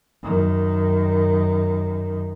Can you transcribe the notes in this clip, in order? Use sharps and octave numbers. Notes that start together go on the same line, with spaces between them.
F#2 D#3